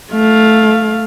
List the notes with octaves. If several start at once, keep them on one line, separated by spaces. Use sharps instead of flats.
A3 F5